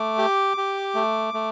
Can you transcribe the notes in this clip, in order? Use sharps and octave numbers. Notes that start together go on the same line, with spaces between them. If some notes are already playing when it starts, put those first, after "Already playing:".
Already playing: A3 D6
G4
G4
A3
A3